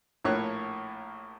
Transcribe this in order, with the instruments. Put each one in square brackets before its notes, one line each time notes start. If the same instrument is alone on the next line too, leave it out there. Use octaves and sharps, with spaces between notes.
[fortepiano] A#1 A2 A#3 C#5 C#6 F#6